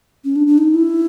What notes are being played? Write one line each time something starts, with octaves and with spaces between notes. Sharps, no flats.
C#4
D4
D4
D#4
E4